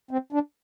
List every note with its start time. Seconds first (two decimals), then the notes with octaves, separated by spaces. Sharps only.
0.11 C4
0.33 D4